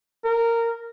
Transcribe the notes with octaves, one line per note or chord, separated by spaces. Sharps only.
A#4